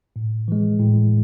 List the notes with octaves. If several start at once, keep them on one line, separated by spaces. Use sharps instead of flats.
A2
E3 G#3
A2